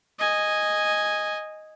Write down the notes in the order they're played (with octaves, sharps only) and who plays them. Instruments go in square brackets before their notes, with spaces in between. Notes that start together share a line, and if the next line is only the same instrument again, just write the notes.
[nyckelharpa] D#5 G#5